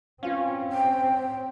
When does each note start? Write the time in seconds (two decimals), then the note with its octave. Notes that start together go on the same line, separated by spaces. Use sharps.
0.23 C4 C#4 F4 B4 F5
0.72 G5